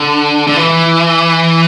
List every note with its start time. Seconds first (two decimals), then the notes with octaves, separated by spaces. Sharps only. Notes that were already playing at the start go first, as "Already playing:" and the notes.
Already playing: D3
0.47 D3
0.56 E3